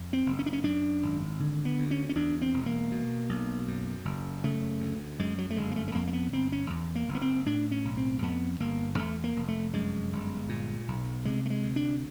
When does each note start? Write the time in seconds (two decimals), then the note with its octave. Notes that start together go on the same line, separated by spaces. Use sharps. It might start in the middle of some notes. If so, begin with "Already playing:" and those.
Already playing: F2
0.13 C4
0.26 F#1
0.39 C#4
0.46 D4
0.53 C#4
0.64 F#2 D4
1.03 G#1
1.40 D3
1.65 B3
1.78 D2
1.91 C#4
2.09 C#4
2.15 E2 D4
2.42 C4
2.54 E1
2.66 A#3
2.91 B2
3.29 B1
3.68 F#2
4.05 F#1
4.44 C#3 A3
4.80 D2
5.19 F#2 G#3
5.38 F#3
5.50 A3
5.56 G1 G#3
5.71 A#3
5.76 A3
5.88 A3
5.95 F2 A#3
6.07 A#3
6.13 B3
6.32 G1 C4
6.52 C#4
6.70 E2
6.95 A#3
7.08 F#1
7.15 B3
7.22 C4
7.46 A2 D4
7.71 C#4
7.85 B1
7.97 C4
8.22 F2 B3
8.60 G1 A#3
8.98 E2 A3
9.24 A#3
9.37 F1
9.48 A3
9.74 F#2 G#3
10.12 G1
10.49 A#2
10.88 B1
11.25 C3 G#3
11.46 A3
11.50 G#3
11.63 D2
11.76 D4